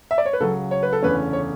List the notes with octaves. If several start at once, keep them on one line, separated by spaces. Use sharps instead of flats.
E5
D5
C#5
B4
C#2 C#3 F#3 A4
C#5
B4
A4
F#1 E2 D3 A3 C#4 B4
C#5